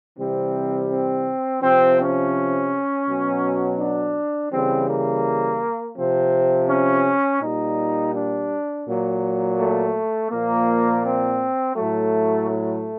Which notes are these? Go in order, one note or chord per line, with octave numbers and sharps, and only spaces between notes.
C3 E3 G3 C4
C4
C3 F3 C4
C#4
B2 F#3
D4
C#3 E3 G3 C4
A#3
C3 F3 C4
C#4
A#2 G3 D#4
D4
A#2 F#3
A3
A#2 F3 A#3
C4
A2 F#3 A3
A3